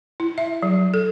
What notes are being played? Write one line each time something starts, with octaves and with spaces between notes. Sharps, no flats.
E4
E5
F#3
A4